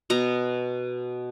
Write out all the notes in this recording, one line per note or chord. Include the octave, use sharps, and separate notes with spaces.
B2 A#5